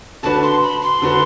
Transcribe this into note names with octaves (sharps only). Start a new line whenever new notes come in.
D3 A3 D4 F#4 B4 A5
C6
B5
C6
D3 A3 D4 F#4 B4